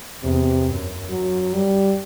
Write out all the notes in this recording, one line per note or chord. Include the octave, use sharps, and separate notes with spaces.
E2 C3
F#2
F#2 F#3
G3